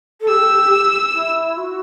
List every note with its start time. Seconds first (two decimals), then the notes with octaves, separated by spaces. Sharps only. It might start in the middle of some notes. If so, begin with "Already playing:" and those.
0.20 A4
0.28 G4 E6
1.13 E4
1.57 F#4